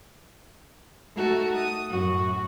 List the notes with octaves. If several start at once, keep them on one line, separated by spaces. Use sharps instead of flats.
A3 D#4 F#4 A4
D#6
F#2 A2 F#4